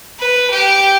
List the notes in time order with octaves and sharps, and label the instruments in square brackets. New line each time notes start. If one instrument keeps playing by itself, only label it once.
[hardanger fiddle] B4
G4 G5